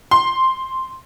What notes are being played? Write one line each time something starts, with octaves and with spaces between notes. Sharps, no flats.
C6